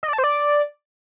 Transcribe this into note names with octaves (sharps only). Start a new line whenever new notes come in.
D#5
D5
A5
C5
D5